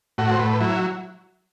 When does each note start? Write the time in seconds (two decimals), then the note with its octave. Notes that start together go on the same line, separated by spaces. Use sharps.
0.18 A2 F#4
0.32 C5
0.39 A2 B4
0.60 F#3 E4